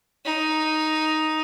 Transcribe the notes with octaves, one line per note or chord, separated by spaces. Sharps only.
D#4